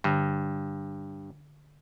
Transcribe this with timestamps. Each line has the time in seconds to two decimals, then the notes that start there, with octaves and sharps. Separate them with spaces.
0.04 G2 D3